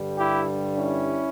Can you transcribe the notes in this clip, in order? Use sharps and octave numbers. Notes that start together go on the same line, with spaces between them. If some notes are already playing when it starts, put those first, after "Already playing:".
Already playing: G2 D3 G3
E4 G4
C#4 E4